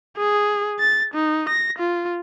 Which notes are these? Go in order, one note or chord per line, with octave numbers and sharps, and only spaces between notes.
G#4
A6
D#4
A#6
F4